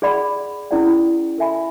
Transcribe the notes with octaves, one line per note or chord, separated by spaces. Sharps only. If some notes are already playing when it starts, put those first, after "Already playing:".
G#4 D5 F#5 B5
C#4 E4 G#4 D5 F#5
A4 E5 G#5 B5